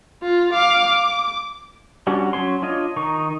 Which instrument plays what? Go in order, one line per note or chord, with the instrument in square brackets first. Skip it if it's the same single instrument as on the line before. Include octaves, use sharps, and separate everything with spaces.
[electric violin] F4
F5 D6
D6
[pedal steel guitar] G3 C#4 D4 F#4
F#3 C#4 C#5 C6
D4 F4 C#5 D#5
D#3 D#4 C#6